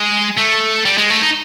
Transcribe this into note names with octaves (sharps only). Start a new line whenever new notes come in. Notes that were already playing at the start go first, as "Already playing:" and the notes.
Already playing: G#3
A3
G3
G#3
A3
D#4